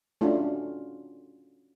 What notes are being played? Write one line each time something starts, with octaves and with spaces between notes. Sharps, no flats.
A3 C#4 D4 F4 F#4